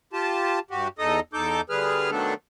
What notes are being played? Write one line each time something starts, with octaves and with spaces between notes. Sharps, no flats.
F4 G4 A5
G2 F#4 G4
E2 D#4 A4 D#5 D#6
E2 D#4 A4 D6 G6
D3 G3 G#4 B4 F6
D#3 F#3 A3 B3 D4 A4